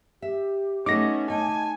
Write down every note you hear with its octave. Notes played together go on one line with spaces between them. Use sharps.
G4 E5
A3 B3 C#4 D#4 D6 A#6
D#4 G#5 A5